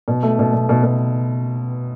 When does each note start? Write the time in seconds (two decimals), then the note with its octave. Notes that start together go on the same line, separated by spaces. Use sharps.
0.08 B2
0.23 A3
0.39 B2
0.53 B2
0.69 B2
0.83 B2